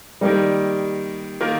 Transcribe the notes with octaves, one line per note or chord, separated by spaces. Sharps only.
D#3 G3 A#3 D#4
D#3 A#3 F4 A#4